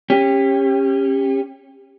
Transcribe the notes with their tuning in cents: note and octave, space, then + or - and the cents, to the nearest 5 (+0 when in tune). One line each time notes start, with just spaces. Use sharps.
C#4 -20 G4 +20